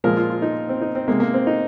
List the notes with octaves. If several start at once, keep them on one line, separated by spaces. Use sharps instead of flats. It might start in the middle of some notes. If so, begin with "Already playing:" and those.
A#2 F3 G#3 A#4
F4
F4
D#4
C4
D#4
C4
C3 G#3 A#3
A#3
C4
D#4